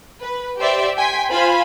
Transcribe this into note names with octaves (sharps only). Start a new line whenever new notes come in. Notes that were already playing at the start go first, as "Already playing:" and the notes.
B4
G4 C5 D5 E5
G5 G#5 C6 B6
F4 C5 F5 G#5 B5